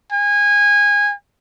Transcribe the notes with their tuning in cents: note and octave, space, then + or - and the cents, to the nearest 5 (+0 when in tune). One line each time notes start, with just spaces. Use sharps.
G#5 -20